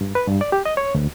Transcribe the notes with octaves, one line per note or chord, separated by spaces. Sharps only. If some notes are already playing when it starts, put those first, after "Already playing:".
G2
B4
G2
D5
G4
D#5
C#5
D2